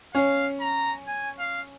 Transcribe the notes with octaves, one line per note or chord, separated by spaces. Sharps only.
C#4 F5
A#5
G#5
F5